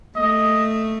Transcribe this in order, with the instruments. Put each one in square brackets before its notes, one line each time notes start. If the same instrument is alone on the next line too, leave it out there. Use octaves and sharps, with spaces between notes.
[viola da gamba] A3 [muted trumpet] D#5